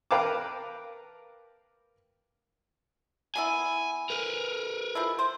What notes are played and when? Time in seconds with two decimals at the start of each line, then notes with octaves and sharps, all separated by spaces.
0.11 A#4 B4 F5 G5 A5 D6
3.36 A#3 B3 E4 G#5
4.10 A#4 B4
4.95 F3 G#3 E4
5.19 C5